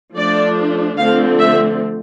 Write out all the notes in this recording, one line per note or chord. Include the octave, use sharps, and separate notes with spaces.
F3 A3 D4 D5
D3 F3 A3 C4 F5
E5